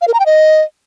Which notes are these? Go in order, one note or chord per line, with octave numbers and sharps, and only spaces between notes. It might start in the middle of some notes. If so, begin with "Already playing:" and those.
F5
A#4
A#5
G5
D#5